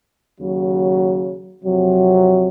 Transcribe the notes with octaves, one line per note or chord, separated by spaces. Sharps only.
D#2 C#3 F#3
F2 C3 F#3